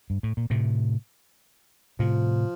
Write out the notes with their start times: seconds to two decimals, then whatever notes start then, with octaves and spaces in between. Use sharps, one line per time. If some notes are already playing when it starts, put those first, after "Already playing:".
0.10 G2
0.23 A2
0.37 A#2
0.50 A2 C3
1.99 A2 C3 F3